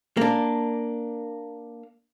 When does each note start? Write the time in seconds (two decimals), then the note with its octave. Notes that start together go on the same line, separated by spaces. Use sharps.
0.17 A#3 D4